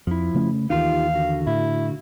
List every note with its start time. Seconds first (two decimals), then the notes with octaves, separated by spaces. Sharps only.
0.07 F2 F3 E4
0.34 C#3 A3 C#4
0.70 D#2 D#3 E3 D#4 F4 G4 F5
1.14 D3 F#4
1.47 A2 E4